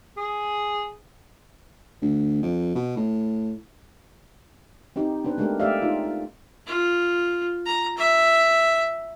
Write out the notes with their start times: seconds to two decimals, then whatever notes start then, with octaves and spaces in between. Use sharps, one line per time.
0.17 G#4
2.02 D2
2.43 F2
2.75 B2
2.97 A2
4.96 C4 D#4 G4
5.24 B3 D4 B4 C5
5.38 G#3 A3 B3 D4 G4 A#4
5.60 A3 G4 D5 E5 F5
5.82 D#4 F4
6.67 F4
7.66 A#5
7.98 E5